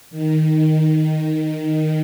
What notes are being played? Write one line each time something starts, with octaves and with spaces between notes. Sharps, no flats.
D#3